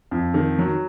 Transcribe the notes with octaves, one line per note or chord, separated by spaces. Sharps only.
F2
D#3
F#3